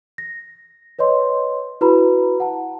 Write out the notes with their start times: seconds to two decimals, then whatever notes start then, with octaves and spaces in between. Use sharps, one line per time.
0.18 A#6
0.99 B4 C#5 D#5 C6
1.81 E4 F#4 B4 A#5 B5
2.40 F#5 A5